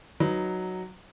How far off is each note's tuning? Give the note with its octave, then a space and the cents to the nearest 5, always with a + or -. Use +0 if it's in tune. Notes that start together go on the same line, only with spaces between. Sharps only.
F#3 +0 D#4 +0 B4 +0